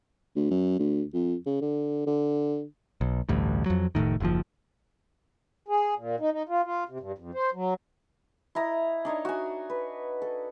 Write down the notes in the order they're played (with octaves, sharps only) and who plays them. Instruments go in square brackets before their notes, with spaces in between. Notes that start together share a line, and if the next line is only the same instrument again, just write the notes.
[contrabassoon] D2
F#2
D2
F2
C#3
D3
D3
[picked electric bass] B1
A1 D2 G2
F2 F#3
F1 C2 A2 D#3
F#1 D#2 F3
[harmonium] G#4
A#2
D#4
D#4
F4
F4
C3
G2
F2
C5
F#3
[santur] E4 D#5 A#5 D#6
D4 D#4 C#5 D#5
F#4 G#5
B4
A4